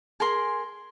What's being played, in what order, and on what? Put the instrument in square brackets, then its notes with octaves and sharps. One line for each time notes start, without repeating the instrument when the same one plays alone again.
[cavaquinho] G#4 A#4 G#5 C6